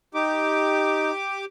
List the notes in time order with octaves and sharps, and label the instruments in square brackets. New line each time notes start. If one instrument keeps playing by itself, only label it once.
[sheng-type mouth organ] D#4 [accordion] G4 D6